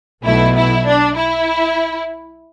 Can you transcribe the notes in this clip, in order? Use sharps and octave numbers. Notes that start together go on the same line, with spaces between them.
B1 B2 A3 E4
E4
D4
E4